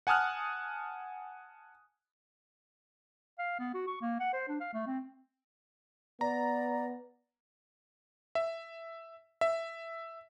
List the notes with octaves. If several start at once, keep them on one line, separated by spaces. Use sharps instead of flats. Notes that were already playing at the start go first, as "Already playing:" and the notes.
F#5 G#5 A5 D#6 F6 F#6
F5
B3
F#4
C#6
A#3
F#5
C5
D4
F5
A3
C4
B3 D5 A#5
E5
E5